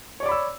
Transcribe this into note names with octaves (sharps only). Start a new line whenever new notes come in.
C#5 D5 B5 D6 E6